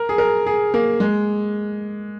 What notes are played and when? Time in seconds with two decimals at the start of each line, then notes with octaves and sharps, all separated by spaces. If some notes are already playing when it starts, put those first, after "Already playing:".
Already playing: A#4
0.09 G#4
0.18 A#4
0.47 G#4
0.74 A#3
1.00 G#3